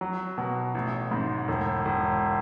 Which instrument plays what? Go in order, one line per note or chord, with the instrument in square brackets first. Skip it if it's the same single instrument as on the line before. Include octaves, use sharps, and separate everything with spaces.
[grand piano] F#3
B2
A1
G#2
E1
E1